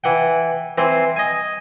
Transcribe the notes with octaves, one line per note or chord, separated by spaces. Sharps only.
E3 F#5 G5
E3 C4 C5
D#5 G#5